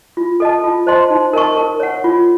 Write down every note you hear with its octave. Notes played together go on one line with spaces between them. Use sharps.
F4
A4 D#5 A5
F4
C5 D#5 A5 C6
D#4
A#4 D#5 A5 C#6
A#4
C#5 F#5
F4